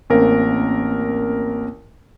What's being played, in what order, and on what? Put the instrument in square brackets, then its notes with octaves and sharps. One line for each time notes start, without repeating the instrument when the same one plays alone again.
[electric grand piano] A1 A#4 [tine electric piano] A#3 C4 C#4